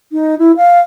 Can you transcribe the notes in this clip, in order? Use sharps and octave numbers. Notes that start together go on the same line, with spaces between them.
D#4
E4
F5